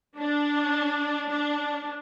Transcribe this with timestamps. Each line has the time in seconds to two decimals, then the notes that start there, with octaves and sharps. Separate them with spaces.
0.17 D4
1.28 D4